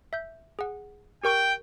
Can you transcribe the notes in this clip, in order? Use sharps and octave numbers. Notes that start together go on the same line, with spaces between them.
E5 G6
G#4 F#5
G4 A#4 G5 C#6